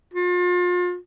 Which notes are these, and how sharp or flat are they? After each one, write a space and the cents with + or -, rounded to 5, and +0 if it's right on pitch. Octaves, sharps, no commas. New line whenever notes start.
F4 +35